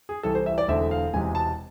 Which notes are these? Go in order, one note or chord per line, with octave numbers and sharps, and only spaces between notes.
G#4
C2 C3 E3 A4
C5
E5
D5
E1 E2 D3 A3 C4 E5
F5
E1 E2 C3 E3 G#3 G#5
A5